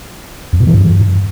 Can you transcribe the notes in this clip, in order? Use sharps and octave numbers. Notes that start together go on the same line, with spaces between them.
F2
B2
E3
G2